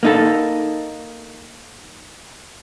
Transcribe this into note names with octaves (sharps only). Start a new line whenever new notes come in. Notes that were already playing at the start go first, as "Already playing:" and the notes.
A#3 D#4 A4